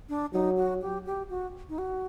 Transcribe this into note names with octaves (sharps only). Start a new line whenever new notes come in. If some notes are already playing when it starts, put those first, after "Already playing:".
D4
F#3 D#4
F#4
G4
G4
F#4
D#4
F#4